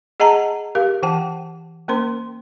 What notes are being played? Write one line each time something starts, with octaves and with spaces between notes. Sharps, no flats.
G#4 D#5 F#5 A5 A#5
G4 A#4 F5
E3 F#5 G5 A5
A#3 C#4 A#4 C5 C6